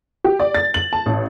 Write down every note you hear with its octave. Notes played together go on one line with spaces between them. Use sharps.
G4
D5
A6
F#7
A5
A1